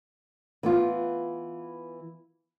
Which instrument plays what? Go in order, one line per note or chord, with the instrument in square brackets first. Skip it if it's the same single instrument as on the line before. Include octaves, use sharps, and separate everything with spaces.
[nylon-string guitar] E3 B3 F4